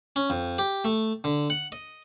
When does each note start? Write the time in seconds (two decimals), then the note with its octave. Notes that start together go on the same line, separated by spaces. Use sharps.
0.16 C#4
0.30 F2
0.58 G4
0.85 A3
1.24 D3
1.50 F#5
1.72 D#5